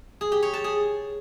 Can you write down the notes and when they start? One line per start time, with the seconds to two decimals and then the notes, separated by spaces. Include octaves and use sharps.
0.21 G#4
0.32 G4
0.43 C#5
0.53 A5
0.64 G#4